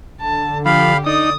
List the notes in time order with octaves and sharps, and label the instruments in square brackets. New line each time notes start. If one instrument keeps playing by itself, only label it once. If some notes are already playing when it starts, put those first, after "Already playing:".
[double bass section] D3 [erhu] A5
[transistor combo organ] F3 [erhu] G4 [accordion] F5 B5
[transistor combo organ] D#4 [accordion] D5 [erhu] D#6